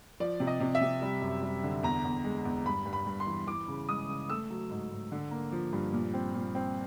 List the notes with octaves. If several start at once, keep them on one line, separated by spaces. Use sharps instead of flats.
F3 D5
C3
D#5
C3
E5
C3
G3
F#2
G3
D3
E2 A#5
E2
G#3
E2
G2 B5
G2
B5
G2
C6
E3
E3 D6
C#3
G#3 D#6
C#3
A3 E6
F#3
G#2
G#2
D3
A#3
F3
G2
A#2
C4
A#2
C4